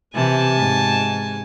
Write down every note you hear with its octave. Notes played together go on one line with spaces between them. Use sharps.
C3 E3 G#5 A5
G#2